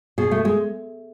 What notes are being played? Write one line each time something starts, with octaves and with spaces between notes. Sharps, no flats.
B2 G#4
A3
G#3